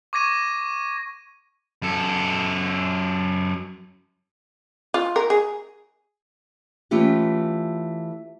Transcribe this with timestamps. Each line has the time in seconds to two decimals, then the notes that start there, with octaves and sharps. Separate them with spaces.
0.13 C#6 D6 G#6 A#6 D#7
1.82 F#2 A4
4.94 F4
5.16 A#4
5.30 G#4
6.91 E3 A3 C#4 F4 G4